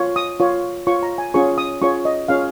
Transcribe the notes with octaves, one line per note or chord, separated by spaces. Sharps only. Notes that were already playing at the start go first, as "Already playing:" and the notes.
Already playing: F4 C#5
D#6
F4 C#5
F4 C#5 C#6
A#5
G#5
C#4 F4 G#4 C#5 C#6
D#6
C#4 F4 G#4 C#5 C#6
D#5
C#4 F4 G#4 C#5 F5